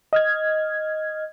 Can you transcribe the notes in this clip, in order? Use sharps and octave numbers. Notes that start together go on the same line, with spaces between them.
D#5 F6 G#6